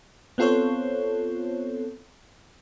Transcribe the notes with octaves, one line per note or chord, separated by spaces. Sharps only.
B3 C4 F4 A4 C5 C#5